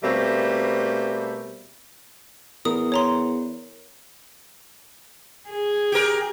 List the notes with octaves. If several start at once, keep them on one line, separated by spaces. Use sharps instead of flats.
B2 G3 A3 A#3 C4
E2 A#4 D#6
C#5 A#5 C6
G#4
G4 A#4